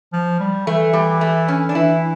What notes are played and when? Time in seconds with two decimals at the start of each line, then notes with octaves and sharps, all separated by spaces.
0.13 F3
0.40 G3
0.67 E3 A3
0.93 G3
1.21 A3
1.48 C#4
1.69 D4
1.75 E3 E4